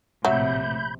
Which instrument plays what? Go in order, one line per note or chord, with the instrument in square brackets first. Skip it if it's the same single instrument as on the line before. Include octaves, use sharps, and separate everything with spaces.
[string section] A#1 A2 C3 [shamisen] F#3 [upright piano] E5 [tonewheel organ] B5 G6